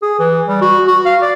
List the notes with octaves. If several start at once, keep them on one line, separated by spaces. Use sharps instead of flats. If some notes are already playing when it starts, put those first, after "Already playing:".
G#4
E3
G3
F#4
F#4
F5
D5